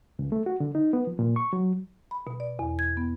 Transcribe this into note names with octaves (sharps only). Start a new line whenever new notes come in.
C#2
A3
F#4
D3
D#4
B3
F3
A#2
C#6
F#3
B5
B2
D5
E2
G#6
B3